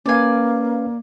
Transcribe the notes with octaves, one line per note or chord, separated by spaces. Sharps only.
A#3 C#4 B4 D5 F5 G#5